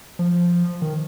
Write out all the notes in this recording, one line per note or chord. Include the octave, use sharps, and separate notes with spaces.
F3
D#3